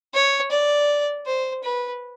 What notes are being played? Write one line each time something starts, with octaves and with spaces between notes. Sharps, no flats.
C#5
D5
C5
B4